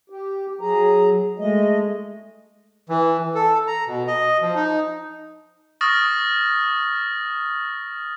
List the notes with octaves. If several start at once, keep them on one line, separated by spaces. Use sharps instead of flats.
G4
F#3 G#4 A#5
G#3 A3 D#5
E3
A4
A#5
B2
D#5
F3
D#4
C#6 D#6 F6 A6 A#6